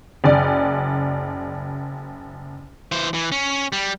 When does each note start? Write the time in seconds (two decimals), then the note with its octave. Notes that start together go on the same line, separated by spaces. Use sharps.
0.24 F#1 D5
2.92 E3 C5
3.14 E3
3.32 C#4
3.72 G3